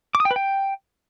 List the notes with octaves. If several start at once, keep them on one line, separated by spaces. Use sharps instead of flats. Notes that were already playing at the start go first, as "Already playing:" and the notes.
D6
D#6
G5
B4
G5